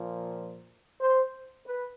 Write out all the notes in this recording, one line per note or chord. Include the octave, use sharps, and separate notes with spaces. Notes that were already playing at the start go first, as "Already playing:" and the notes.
Already playing: A#2 F3
C5
B4